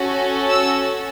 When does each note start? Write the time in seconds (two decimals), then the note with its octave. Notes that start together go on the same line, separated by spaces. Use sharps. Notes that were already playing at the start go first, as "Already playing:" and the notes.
Already playing: C#4 F#4 A4
0.51 E6